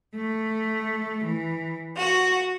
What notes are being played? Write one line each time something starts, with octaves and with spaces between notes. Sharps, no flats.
A3
E3
F#4